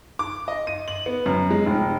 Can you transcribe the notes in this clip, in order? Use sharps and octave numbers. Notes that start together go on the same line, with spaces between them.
D6
D#5
D#7
F#7
B3
F#2
G#3
F1